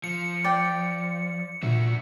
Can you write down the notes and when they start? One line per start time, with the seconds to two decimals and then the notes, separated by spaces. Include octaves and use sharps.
0.04 F3 C#7
0.44 D5 G5
1.63 A#2 D4 F#4 E5